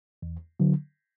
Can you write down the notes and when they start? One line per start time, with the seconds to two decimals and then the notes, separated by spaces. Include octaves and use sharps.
0.22 E2
0.60 D3 F#3